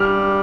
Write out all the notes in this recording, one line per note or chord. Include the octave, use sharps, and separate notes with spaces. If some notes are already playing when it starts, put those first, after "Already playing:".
Already playing: G3 F6